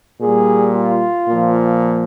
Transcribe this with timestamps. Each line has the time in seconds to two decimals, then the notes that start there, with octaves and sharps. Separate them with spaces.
0.20 A#2 G3 G#4
0.73 F4
1.27 A#2 F3